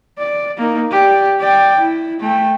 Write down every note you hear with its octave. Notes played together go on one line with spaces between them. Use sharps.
D5
A#3 D#4
G4 D5
D5 G5
E4
A3 G5